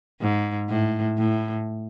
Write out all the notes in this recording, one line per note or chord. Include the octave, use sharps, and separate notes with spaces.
G#2
A2
A2